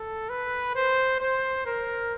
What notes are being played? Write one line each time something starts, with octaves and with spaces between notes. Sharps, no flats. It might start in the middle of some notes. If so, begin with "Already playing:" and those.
Already playing: A4
B4
C5
C5
A#4